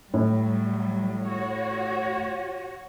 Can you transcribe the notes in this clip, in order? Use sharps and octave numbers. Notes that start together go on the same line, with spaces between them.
A2 F#3 G3
F#4 C#5